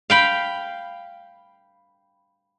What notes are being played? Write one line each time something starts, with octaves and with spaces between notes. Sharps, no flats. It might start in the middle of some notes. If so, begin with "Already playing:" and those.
F5 G5 B5